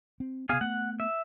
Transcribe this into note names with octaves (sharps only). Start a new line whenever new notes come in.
C4
C3 B3 G#4 F5 G#5
A3 B3 F#5
E5